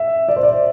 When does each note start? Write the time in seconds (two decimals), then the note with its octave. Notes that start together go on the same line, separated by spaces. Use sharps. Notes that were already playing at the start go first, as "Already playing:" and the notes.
Already playing: E5
0.29 D5
0.36 C5
0.43 D5